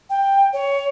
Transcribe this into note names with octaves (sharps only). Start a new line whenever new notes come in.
G5
C#5